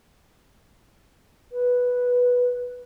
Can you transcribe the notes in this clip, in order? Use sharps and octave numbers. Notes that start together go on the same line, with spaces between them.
B4